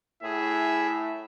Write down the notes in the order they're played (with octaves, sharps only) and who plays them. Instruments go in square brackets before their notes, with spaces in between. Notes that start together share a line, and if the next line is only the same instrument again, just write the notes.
[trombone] A2 [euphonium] E4 [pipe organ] G#4 [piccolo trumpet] E5